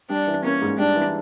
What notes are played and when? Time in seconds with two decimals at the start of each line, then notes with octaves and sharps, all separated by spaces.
0.10 G3 D4
0.27 E3
0.44 A#3 C#4
0.61 G#2
0.78 G3 D4
0.95 E3